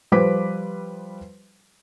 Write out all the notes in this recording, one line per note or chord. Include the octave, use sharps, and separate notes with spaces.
F3 G3 B4 C5 D6 B6